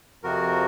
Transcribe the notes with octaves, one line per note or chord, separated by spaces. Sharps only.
F2 C3 F3 F#4 A#4